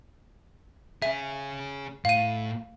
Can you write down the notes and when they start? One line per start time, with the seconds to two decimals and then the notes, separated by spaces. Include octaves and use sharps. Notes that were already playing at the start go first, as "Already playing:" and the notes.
1.02 C#4 G#4 E5
2.05 A2 F5 D#7